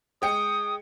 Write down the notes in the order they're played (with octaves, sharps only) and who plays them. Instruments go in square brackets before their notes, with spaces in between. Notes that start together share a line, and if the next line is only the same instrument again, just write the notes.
[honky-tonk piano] G#3 G5 C#7 [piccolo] D#6